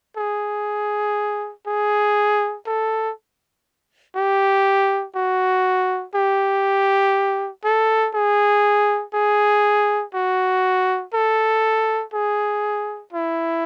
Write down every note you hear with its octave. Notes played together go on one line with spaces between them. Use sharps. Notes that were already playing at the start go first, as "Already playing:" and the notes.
G#4
G#4
A4
G4
F#4
G4
A4
G#4
G#4
F#4
A4
G#4
E4